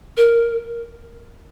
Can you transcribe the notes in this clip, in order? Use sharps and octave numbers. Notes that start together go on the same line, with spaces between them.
A#4